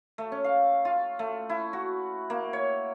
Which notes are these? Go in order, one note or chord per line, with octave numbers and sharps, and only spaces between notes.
A3
C#4
F5
F4
A3
E4
F#4
A#3
C#5